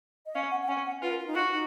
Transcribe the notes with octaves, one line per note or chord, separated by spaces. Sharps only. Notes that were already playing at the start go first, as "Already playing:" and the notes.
D#5
C#4 F5
F#5
F#5
C#4 G#5
F#5
F4 B4
A#4
F4
D#4
F4 F#4
D#4